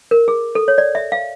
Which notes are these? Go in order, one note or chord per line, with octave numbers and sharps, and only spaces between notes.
A#4
G#4
A4
C#5
D5
E5
F5